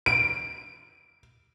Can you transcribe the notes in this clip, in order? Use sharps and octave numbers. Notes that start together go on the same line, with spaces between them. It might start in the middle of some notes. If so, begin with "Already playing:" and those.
D7